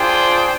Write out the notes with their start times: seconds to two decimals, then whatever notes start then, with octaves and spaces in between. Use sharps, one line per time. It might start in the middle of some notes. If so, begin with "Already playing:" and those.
Already playing: D4 F4 G#4 C5 G5